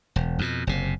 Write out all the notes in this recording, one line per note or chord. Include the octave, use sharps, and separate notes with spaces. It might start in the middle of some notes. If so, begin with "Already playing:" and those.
E1
F2 B2
F#1 C3